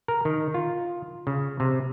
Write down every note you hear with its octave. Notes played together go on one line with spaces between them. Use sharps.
A#4
D#3
F4
C#3
C3